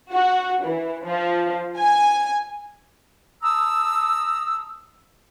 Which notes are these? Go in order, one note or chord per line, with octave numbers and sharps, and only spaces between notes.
F#4
E3
F3
G#5
A5 A#5 D#6 E6